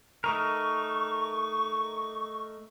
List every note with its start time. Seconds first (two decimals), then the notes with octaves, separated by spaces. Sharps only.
0.24 A3 D#4 A#4 C#6